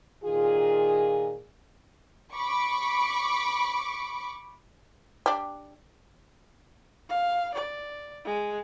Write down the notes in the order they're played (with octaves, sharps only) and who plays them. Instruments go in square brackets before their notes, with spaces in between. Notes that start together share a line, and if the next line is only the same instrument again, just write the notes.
[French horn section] A#2 D#3 F4 G#4
[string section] B5 C#6 D6
[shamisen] D4 G4
[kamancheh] F5
D5
G#3